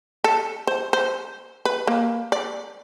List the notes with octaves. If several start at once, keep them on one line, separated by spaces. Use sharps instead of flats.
A4
C5
C5
B4
A#3
D5